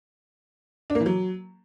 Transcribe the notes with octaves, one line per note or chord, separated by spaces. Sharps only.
D4
A#3
E3
F#3